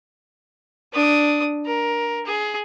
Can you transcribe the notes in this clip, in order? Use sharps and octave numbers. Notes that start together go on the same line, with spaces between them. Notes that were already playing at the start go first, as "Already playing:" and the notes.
D4 D#6
A#4
G#4